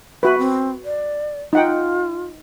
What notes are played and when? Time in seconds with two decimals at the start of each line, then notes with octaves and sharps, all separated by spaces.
0.23 F#4 B4 E5
0.38 C4
0.85 D5
1.53 D#4 F4 F#5 G5